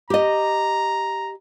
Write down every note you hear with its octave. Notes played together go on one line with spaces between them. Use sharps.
G4 D#5 A#5